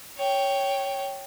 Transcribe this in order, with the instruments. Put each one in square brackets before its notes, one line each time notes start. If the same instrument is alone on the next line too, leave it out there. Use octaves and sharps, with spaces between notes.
[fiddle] C#5 G5